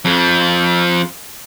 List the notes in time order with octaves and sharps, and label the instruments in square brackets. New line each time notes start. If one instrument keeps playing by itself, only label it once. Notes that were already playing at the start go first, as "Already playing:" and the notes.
[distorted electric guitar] F2 F3